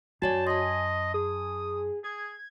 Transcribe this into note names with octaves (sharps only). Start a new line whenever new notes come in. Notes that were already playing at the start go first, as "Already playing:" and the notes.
F#2 F#4 C#5 D5 G#5 A5
D#5 A5 C6
G#4 D#6
G#4 G#6